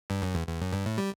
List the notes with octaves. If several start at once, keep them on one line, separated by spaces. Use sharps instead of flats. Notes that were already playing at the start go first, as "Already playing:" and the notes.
G2
F#2
E2
E2
F#2
G2
A2
G3